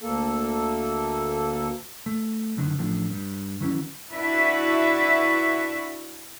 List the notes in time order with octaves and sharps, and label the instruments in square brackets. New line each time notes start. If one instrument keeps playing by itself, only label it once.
[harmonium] D2 A#3 A4
[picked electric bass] A3
F#1 F#2 D3 D#3
A1 F3 A3 D4
G2
D#3 E3 F#3 C#4
[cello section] D4 E4 F#4 B4 E5